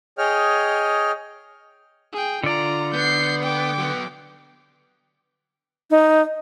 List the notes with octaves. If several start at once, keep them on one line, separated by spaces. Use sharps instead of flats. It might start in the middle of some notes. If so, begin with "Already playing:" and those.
G#4 C#5 D#5 G5 F6
G#4 G5
D3 F4 D5 A#5
B3 G6 C7
G5 D6
F#3 B3
D#4